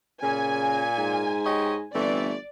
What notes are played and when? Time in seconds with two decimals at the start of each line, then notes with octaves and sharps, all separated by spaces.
0.22 A#2 C#3 G#5
0.97 G#2
1.45 G4 C#5 D#5
1.94 G1 C3 E3 A3 D5